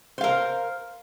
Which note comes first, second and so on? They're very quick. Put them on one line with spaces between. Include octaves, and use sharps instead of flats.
C5 F5 A#4